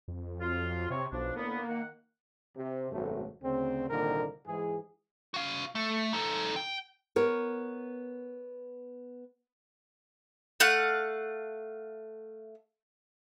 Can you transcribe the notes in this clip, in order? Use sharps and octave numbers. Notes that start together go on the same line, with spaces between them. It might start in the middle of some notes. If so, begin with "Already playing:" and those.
F2
F#3 F4
C3 C4 C#5
B1 F3 D4
A2 D3 A#3 B3
D#3 F#5
C3
G#1 F#2 B2 F#3 A3
D2 C#3 C4
C2 A#2 D3 D#3 A#3 A#4
G#2 E3 G#4
F#4 F5
A3
D#4 A4
G5
B3 A#4 C#5
A3 F5 F#5